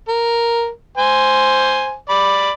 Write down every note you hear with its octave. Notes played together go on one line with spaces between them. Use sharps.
A#4
C5 G#5
D5 B5